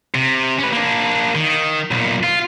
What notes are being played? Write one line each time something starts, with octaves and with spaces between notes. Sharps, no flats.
C3
C#4 B4
A#3 D4
D#3
B1 A#2
F4